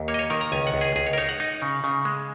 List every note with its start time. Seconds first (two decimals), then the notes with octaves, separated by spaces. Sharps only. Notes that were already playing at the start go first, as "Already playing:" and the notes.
Already playing: D#2
0.08 A#3 C#5
0.14 D#5
0.19 C#5
0.30 D#3 A#4
0.41 A#5
0.52 C#2 G#5
0.67 F#5
0.74 C#2
0.81 G#4
0.96 C#2 G#4
1.07 C#5
1.13 A#4
1.18 D#4 C#5
1.29 F#5
1.40 D#4
1.62 C#3
1.84 C#3
2.05 G#3